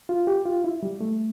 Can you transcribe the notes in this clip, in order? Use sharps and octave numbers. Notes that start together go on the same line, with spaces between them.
F4
G4
F4
E4
G3
A3